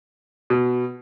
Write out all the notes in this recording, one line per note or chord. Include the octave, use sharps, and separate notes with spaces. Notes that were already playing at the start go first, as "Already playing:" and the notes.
B2